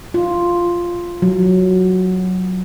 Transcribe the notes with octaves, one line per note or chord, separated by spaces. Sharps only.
F4
F#3